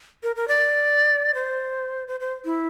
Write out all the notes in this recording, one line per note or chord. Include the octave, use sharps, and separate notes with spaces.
A#4
A#4
D5
C5
C5
C5
E4